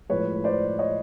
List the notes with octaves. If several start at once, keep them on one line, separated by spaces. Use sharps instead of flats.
A2 F3 G#3 B4 C#5
C5 D5
C#5 D#5